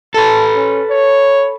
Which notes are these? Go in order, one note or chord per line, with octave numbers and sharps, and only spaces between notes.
A4 B4 A5
C#4
C#5